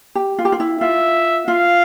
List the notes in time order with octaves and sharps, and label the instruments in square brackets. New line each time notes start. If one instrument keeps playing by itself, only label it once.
[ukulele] G4
F4
G4
F4
E4
[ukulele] F4 [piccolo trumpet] E5
[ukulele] F4 [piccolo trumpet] F5